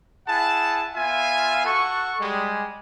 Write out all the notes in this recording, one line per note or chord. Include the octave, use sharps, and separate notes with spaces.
E4 G#4 F#5 A5
B3 F4 E5 F5 G#5
F#4 A4 F#5 C#6
G3 G#3